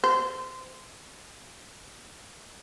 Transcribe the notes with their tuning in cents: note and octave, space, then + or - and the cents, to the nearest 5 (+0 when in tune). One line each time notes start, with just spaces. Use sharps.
C5 -20